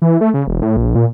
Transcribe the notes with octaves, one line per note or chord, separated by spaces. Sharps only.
E3
A3
C#3
E1
A2
A#1
A#2